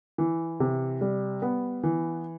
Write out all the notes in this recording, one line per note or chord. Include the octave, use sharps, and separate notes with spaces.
E3
C3
G3
B3
E3